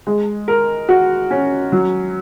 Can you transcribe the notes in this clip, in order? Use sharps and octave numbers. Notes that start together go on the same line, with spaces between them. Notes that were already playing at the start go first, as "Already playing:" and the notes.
G#3
A#4
F#4
C#4
F#3